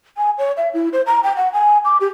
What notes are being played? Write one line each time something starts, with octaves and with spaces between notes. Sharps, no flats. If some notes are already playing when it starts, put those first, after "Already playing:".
G#5
C#5
E5
E4
C5
A#5
G5
F#5
G#5
D6
G4